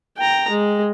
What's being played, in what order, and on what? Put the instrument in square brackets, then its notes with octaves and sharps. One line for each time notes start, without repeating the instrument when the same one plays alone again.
[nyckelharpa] G5 A#5
G#3